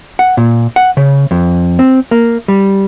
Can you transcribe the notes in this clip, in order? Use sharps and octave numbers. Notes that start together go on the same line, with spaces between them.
F#5
A#2
F#5
C#3
F2
C4
A#3
G3